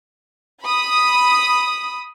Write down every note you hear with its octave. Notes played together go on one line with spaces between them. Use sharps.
B5 D#6